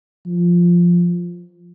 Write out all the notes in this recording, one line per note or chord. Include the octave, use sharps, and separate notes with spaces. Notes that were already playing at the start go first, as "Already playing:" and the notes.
F3